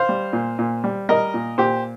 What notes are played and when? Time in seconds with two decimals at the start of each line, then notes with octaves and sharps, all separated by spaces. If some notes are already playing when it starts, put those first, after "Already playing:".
Already playing: C5 F5
0.09 G3
0.33 A#2
0.59 A#2
0.84 G3
1.09 G3 A#4 D#5
1.34 A#2
1.58 A#2 G4 C5